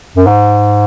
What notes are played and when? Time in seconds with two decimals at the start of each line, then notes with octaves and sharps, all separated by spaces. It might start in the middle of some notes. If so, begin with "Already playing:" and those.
0.17 F#2
0.27 G#2